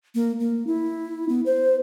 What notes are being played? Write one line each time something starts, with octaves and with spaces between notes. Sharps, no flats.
A#3
A#3
E4
B3
C5